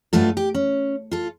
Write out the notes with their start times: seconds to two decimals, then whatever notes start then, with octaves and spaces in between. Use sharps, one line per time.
0.13 G2 F#3 A3 F4 A4
0.37 G4
0.55 C#4
1.11 F4 A4